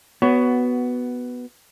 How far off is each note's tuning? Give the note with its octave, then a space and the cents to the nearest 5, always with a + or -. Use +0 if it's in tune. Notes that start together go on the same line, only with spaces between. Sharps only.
B3 +0 F#4 +15 C#5 +20